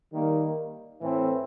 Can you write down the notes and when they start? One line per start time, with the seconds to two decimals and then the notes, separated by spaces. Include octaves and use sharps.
0.11 D#3 G3 A#3
1.01 A2 E3 A3 C4